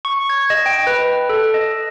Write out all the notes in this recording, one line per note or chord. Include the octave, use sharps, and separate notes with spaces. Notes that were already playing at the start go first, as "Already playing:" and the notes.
C#6
G#6
D#5
G5
B4
A4
D#5